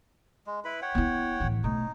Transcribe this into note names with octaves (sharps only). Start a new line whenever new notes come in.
G#3
E4 B4 B5
C#5 F#5 G5
B3 E4
A1 E3
B1 A3 D#4